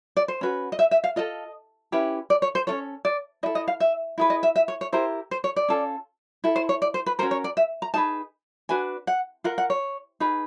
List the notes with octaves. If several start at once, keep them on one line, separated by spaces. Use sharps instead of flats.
D5
C5
C#4 F#4 B4
D#5
E5
E5
F5
F4 A4 D#5
C#4 E4 G4 B4
D5
C#5
C5
C#4 F4 A4 C#5
D5
E4 A4 D#5
D#5
F5
E5
E4 G#4 B4
D#5
E5
E5
C#5
C#5
E4 G4 A#4 C5
C5
C#5
D5
C#4 F4 A4
E4 A4
C5
C#5
D5
C5
B4
C#4 F#4 A#4 C5
C#5
D5
E5
A#5
D#4 G#4 B4 A5
D4 F#4 B4 G#5
F#5
F4 A#4 F#5
F#5
C#5
D#4 G#4 B4